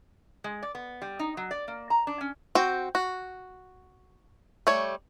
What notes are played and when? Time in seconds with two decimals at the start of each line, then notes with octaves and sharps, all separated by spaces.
0.44 G#3
0.63 D5
0.75 B3
1.02 G3
1.19 D#4
1.37 F#3
1.51 D5
1.68 A#3
1.90 A#5
2.07 D4
2.21 C#4
2.55 C4 F#4 G5
2.95 F#4
4.67 G3 A3 C#5